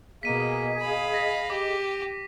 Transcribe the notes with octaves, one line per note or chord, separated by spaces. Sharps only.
B2 A#3 G#4 D#5 B6 D#7
F5 B5
A#6 B6
G4 D6